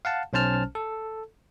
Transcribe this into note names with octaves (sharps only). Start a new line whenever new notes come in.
F5 F#5 A5
B1 C#4 C5 A5 F6
A4